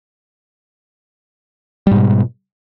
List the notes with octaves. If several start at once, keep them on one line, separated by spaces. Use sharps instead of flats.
G#2 B2 G3